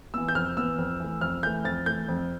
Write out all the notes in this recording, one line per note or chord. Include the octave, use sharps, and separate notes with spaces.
E3 B3 E6
G6
F2 F6
E3 B3 E6
F2
E3 A3
F2 F6
E3 A3 G6
F2 A6
E3 A3 G6
F2